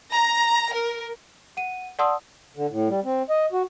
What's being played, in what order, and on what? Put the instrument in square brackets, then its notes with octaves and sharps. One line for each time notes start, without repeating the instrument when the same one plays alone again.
[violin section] A#5
A#4
[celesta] F#5 D#7
D5 F#5 A5 C6 D#6 E6
[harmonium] D3
A2
G3
C4
D#5
F#4